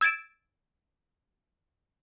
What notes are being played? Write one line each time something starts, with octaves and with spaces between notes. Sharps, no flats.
E6 G#6 A6 D7 E7